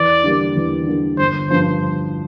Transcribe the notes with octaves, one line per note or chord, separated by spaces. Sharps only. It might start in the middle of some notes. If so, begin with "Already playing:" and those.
Already playing: E2 D5
D3 G3 A#3
E2
D3 G3 A#3
G1 C5
G2 F3 C5